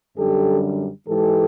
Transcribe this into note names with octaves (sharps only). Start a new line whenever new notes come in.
F#2 D3 G3 G4 A4
G#2 E3 G#3 G4 A4